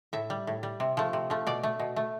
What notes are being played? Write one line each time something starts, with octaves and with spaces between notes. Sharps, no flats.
A2 E5
G3
A2
G3
C3
F3 A3
C3
F3 A3
B2 D5
A3
B2
A3